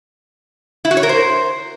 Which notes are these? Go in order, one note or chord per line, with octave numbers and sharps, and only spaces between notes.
E4
F#4
C#5
A#4
C5